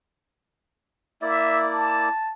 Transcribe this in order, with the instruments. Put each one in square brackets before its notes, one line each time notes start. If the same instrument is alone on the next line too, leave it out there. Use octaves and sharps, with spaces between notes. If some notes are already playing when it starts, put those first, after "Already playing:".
[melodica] A#3 E4 D5 [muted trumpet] E5
[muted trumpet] A5